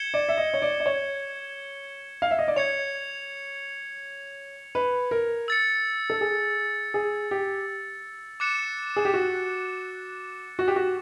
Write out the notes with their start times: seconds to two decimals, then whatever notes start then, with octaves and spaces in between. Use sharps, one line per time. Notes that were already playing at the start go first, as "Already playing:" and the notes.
Already playing: G#6 C#7 E7 G7
0.14 D5
0.29 E5
0.37 D#5
0.54 C#5
0.62 D5
0.80 D5
0.86 C#5
2.22 F5
2.31 E5
2.39 D#5
2.48 D5
2.56 C#5 G#6 C#7 F7
4.75 B4
5.11 A#4
5.48 E6 A6 C#7
6.10 A4
6.21 G#4
6.94 G#4
7.31 G4
8.40 D6 F#6 A6 C#7 E7
8.96 G#4
9.05 G4
9.14 F#4
10.59 F#4
10.68 G4
10.76 F#4